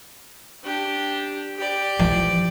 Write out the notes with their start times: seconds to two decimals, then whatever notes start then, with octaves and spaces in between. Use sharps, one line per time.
0.64 D4 G4
1.56 G4 D5
1.99 E3 F3